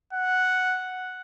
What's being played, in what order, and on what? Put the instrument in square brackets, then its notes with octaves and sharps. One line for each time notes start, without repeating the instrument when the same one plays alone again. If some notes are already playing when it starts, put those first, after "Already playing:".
[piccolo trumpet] F#5